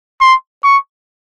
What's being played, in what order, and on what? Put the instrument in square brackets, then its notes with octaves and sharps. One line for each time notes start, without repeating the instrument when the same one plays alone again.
[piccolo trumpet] C6
C#6